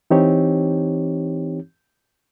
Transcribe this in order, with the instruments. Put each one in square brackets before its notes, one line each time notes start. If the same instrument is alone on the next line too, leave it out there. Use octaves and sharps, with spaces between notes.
[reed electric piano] E3 C4 D#4 G4 C#5